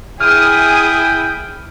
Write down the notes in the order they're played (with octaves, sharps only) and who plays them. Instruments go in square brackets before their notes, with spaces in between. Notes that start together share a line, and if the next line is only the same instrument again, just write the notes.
[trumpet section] E4 G#5 [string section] G#4 D#6 [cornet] G5 [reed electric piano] F6